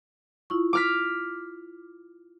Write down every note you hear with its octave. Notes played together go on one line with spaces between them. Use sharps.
E4 F4 C#6
D6 F6 B6